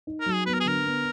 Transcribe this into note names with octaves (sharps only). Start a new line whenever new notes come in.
D#4
A#4
F#3
G#4
B3 B4
A#4
G#4
D3 A#4
B3